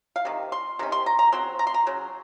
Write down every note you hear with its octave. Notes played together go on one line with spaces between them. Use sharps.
F5
C3 D#3
C6
C3 D#3 C#4
C6
A#5
A#5
C#3 F#3 C4 C6
A#5
C6
A#5
C#3 F#3